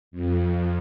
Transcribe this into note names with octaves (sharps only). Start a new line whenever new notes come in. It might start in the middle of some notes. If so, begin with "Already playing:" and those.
F2